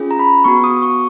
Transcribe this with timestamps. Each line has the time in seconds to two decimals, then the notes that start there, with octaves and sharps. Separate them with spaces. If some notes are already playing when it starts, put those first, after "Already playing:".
Already playing: C#4 F4 G#4
0.11 A#5
0.19 B5
0.44 B3 F#4 C#6
0.64 D#6
0.82 C#6